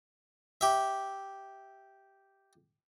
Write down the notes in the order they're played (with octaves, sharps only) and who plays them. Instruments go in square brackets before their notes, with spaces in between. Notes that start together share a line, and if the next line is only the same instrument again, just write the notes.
[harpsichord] G4 E5